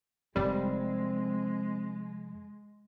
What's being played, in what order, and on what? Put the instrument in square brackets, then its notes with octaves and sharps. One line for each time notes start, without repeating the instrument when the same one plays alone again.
[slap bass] F1 F2 D#3 [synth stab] G3 [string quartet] G#3 [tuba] C4